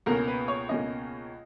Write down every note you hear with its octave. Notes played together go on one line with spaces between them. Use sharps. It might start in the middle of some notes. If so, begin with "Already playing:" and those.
C#2 B2 A#3 C#4 A#4
B4
C#5
C#2 B2 A#3 C#4 D#5